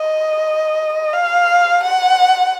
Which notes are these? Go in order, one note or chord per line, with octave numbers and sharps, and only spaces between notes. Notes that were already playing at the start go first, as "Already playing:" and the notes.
Already playing: D#5
F5
F#5